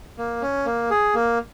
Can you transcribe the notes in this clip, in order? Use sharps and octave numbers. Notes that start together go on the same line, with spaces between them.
A#3
C#4
A#3
G#4
A#3